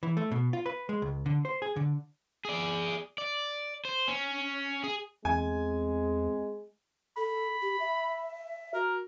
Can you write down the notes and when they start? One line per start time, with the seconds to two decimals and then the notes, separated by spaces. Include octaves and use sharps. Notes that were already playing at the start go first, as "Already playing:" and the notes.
0.03 E3
0.17 A3
0.32 B2
0.53 F4
0.66 B4
0.89 G#3
1.02 C#2
1.26 D3
1.45 C5
1.62 G#4
1.76 D3
2.45 G#4 D5
3.18 D5
3.85 C5
4.08 C#4
4.83 G#4
5.25 E2 G#3 C4 G#5
7.17 A4 B5
7.62 G4
7.80 E5
8.74 F#4 A#4